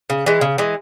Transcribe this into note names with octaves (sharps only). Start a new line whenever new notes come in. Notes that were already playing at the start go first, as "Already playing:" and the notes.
C#3
E3 G#3
C#3
E3 G#3